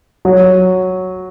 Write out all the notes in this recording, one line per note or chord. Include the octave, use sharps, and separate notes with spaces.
F#3